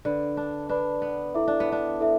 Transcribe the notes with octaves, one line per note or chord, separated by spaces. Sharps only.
D3 B4 D5 B5
D4
D4 B4 D5 B5
B3
E4 A4 E5 D6
D4
B3
D4
E4 A4 E5